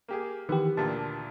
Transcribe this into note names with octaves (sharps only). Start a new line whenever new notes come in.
A#3 G4 G#4
D#3 E3 B3 G4
D2 A#2 G4 A5